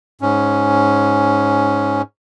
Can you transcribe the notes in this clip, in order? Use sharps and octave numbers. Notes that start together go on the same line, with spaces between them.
G#2 C#4